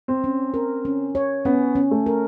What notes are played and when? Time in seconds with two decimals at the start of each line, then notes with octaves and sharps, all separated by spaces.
0.08 C4
0.24 C#4
0.54 A#4
0.85 C#4
1.15 C#5
1.45 B3 C#4
1.75 C#4
1.91 A3
2.06 A#4